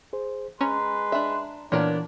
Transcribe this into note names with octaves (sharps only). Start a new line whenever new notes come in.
G#4 C5
G#3 C#4 B4 A#5 C6
D4 E5
A#2 E3 B3 D4 A#4 C#5